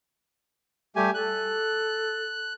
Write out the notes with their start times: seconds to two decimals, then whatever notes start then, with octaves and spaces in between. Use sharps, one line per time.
0.96 G3 A3 G4 G#5
1.14 A4 F#6